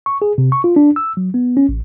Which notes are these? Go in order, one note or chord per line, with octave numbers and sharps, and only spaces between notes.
C#6
G#4
C3
C#6
F4
D4
E6
F#3
B3
C#4
A1